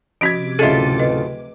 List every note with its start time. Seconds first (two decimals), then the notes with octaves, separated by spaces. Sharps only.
0.21 C3 F3 C#4 F#4 D6 G#6 B6 D7
0.59 D1 C#3 F4 G#4 A4 D#5 E5 D#7
1.00 B4 D#5